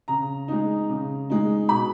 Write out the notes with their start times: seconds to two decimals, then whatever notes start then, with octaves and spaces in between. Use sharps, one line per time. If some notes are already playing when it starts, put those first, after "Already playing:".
0.08 C#3 A#5
0.48 G#3 D#4
0.89 C#3
1.30 G#3 D#4
1.69 B2 B5